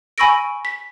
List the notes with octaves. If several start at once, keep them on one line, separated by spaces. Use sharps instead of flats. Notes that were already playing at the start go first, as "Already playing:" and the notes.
G#5 B5 C#6 E6 A#6 D7
B6